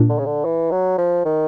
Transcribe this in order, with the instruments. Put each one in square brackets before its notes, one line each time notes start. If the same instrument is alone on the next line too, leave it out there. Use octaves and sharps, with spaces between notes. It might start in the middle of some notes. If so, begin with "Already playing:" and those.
Already playing: [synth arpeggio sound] A#2 A#3 D4
[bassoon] D3
C#3
D3
E3
F#3
F3
D#3